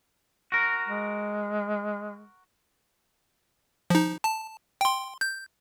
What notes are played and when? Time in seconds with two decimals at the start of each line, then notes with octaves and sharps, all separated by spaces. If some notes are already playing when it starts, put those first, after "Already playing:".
0.52 F#4 A#4
0.88 G#3
3.90 F3 D#4
4.24 A5
4.81 G5 C6
5.21 G6